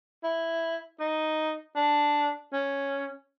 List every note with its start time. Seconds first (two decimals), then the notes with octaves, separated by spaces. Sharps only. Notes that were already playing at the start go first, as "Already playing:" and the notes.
0.24 E4
1.00 D#4
1.76 D4
2.53 C#4